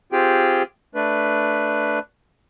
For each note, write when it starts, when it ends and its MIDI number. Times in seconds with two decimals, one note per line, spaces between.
0.12 0.63 60
0.12 0.63 65
0.12 0.63 67
0.12 0.63 68
0.12 0.63 79
0.95 1.99 57
0.95 1.99 62
0.95 1.99 71